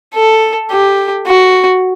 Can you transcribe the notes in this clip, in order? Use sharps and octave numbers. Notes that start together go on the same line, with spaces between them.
A4
G4
F#4